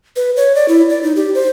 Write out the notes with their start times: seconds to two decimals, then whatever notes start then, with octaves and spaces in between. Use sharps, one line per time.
0.16 B4
0.36 C#5
0.55 D5
0.68 E4
0.90 D5
1.03 D#4
1.16 G4
1.35 C5